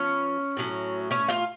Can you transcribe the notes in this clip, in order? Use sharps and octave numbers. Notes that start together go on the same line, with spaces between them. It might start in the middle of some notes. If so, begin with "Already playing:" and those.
Already playing: F3 B3 C#4 C#5
A2 F#3 C#4
C#4 C#5
F4 F5